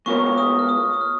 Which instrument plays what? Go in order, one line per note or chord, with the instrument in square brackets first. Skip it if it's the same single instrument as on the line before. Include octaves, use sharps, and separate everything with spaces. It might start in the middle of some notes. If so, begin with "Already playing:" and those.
[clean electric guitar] G#3 B3 F4 A#4 C#5 [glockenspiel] C#6
[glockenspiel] D#6
F6
D#6
D#6
F6